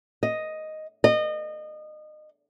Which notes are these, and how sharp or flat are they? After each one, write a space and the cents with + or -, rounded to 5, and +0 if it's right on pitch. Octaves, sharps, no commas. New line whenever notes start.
D#5 +0
D#5 -30